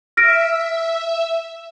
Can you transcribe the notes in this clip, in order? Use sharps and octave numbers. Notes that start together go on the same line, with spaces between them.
E5 F6 A#6 D7